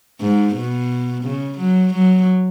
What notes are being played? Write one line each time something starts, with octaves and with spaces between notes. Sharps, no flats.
G#2
B2
C#3
F#3
F#3